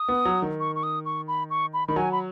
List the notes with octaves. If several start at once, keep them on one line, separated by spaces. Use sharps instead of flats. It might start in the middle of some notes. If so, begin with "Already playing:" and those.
Already playing: D#6
B3
F#3
D#3
C#6
C#6
D#6
C#6
B5
C#6
B5
D#3 B5
F#3 G#5
B5